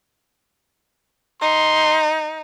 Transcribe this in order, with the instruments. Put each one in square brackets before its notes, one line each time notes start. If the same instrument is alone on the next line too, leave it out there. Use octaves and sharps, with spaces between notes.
[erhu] D#4 [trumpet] C6